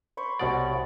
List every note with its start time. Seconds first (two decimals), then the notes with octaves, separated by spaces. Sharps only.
0.17 C5 B5 C#6
0.39 C2 B2 B3 F#4 C#5 D5